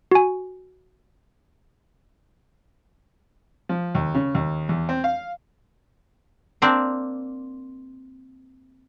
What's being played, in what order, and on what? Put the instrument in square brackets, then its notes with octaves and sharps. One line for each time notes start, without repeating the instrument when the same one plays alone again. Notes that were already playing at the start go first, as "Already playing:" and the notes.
[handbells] F#4 G#5
[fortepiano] F3
D#2
C#3
D#2
E2
C4
F5
[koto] A#3 C4 D4 D5